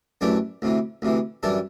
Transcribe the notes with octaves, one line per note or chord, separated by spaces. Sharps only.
F#2 E3 A3 D4 G4
D2 C3 E3
D2 C3 E3
F#2 E3 G3 D4 A4